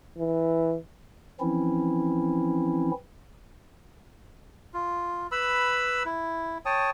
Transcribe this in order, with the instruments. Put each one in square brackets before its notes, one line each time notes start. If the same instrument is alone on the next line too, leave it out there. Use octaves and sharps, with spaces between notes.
[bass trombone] E3
[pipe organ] E3 F3 C4 C#4 E4
[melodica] F4
B4 B5 E6
E4
C#5 G5 A5 D#6